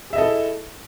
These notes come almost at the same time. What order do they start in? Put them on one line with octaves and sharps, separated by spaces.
G#4 E5 D#5 A4 E4